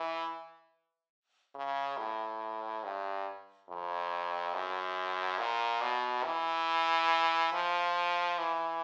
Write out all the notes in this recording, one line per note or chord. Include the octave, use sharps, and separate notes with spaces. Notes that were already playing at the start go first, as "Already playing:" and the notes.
Already playing: E3
C#3
A2
G2
F2
F#2
A#2
B2
E3
F3
E3